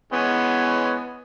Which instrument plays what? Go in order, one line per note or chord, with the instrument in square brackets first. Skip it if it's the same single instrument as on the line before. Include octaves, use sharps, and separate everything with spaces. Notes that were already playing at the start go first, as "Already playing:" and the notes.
[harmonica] E3 G#3 C#4 [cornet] B3